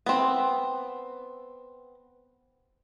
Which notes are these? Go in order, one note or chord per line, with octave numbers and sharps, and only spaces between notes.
B3 C4